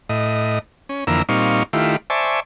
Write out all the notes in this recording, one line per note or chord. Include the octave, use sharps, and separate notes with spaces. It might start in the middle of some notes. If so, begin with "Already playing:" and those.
A2 D#5
C#4
F2 D3 E3 A#3 A#5 E6
A#2 G3 C4 D#4 F5 C#6
D#3 A3 E4 F4 G4
C5 D5 E5 G#5 A5 C#6